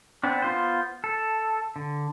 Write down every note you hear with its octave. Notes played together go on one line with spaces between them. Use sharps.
B3 C4 D4
B3 F4 C5
A4
D3